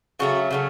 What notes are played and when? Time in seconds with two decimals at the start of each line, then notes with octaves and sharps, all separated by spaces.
0.19 C#3 F#3 A3 F#4
0.51 C#3 F#3 A3